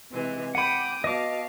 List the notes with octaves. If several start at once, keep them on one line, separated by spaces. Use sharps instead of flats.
C3 E3 G#3
F#5 G5 B5 D6 D#6
B2 D#5 F5 A5 D6